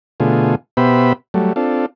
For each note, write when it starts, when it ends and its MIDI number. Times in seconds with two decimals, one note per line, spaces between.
0.20 0.55 47
0.20 0.55 50
0.20 0.55 57
0.20 0.55 65
0.20 0.55 68
0.77 1.13 47
0.77 1.13 59
0.77 1.13 67
0.77 1.13 72
0.77 1.13 76
0.77 1.13 83
1.34 1.53 54
1.34 1.53 55
1.34 1.53 57
1.56 1.86 60
1.56 1.86 62
1.56 1.86 65
1.56 1.86 69